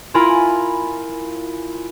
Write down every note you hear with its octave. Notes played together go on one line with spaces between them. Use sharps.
E4 F4 A#4 G#5 B5